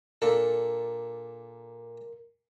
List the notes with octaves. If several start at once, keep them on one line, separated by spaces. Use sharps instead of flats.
A#2 D4 A4 A#4